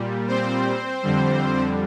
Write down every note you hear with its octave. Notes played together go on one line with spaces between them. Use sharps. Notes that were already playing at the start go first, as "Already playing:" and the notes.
Already playing: A#2 G3
C4 C5
F2 D3 G3